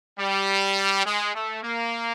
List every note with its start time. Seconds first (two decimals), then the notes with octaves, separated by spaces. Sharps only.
0.20 G3
1.06 G#3
1.34 A3
1.63 A#3